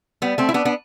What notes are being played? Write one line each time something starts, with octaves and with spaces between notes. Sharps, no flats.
G3 B3
A3 C4
E4
B3 D4
B3 D4